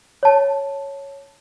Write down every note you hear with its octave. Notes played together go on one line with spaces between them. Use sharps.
C#5 A5